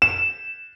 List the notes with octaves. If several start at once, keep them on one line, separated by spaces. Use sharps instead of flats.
E7